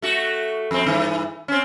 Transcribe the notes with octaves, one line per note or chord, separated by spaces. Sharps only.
A3 F#4
F2 C4
G2 E3
C4 C#4